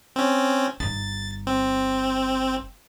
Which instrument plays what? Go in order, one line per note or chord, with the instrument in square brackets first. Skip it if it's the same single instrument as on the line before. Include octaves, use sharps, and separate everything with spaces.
[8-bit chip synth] C4 C#4
[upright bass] G1 D#4 [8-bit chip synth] A6
[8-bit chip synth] C4